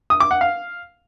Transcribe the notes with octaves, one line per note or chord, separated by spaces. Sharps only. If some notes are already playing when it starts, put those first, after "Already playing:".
D#6
D6
F#5
F5